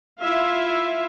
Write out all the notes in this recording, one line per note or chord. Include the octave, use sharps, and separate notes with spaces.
E4 F4 E5 F5